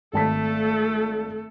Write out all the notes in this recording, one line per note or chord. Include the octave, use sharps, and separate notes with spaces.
G#1 A3 A4 A5 B6